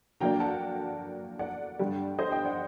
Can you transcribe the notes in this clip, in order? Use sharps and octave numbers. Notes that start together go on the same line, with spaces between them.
D3 F#3 A#3 D4 G5 A#5
F#5 A5
D5 F#5
G2 D3 G3
C5 D#5
D#5 G5
D5 F#5